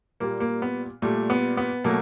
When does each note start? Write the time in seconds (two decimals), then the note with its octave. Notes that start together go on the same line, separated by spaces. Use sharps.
0.20 A#2 G3 A#3
0.40 A#3
0.62 B3
1.02 A#2 G3 A3
1.30 B3
1.57 B3
1.84 B2 F#3 A3 A#3